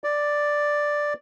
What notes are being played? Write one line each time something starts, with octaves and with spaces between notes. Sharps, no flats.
D5